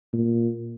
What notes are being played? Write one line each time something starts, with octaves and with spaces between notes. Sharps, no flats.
A#2